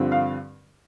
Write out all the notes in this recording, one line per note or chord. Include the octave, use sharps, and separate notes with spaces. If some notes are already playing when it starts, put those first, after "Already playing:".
Already playing: G2 D3 F3 C4
F5